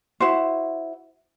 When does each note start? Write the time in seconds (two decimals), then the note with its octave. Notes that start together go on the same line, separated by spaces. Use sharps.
0.20 E4 F#4 C5